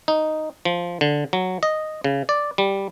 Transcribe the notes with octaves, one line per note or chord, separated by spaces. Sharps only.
D#4
F3
D3
F#3
D#5
C#3
D5
G3